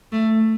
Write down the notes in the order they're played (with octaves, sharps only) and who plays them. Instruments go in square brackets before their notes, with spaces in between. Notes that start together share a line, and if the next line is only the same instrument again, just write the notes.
[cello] A3